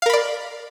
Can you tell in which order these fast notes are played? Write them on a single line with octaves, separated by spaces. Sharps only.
F5 A#4 B5 D5